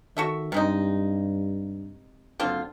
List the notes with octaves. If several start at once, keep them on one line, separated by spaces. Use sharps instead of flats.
D#3 F#4 A4 E5
G2 C3 G#3 D#4
F#1 D3 C4 F4